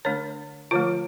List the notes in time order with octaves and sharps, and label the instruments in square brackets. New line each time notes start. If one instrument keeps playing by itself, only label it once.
[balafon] D3 A3 D4 C#5
D3 F3 A3 F4